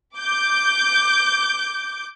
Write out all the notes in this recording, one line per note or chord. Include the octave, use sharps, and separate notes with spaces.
D6 G6